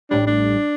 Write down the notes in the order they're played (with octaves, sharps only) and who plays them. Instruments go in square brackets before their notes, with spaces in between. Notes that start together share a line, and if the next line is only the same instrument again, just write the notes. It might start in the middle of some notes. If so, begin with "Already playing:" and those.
[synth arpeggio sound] A1 A2 G3 [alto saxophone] D4
[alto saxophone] D4